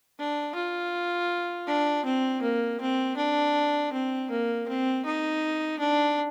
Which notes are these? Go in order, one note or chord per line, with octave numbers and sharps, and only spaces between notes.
D4
F4
D4
C4
A#3
C4
D4
C4
A#3
C4
D#4
D4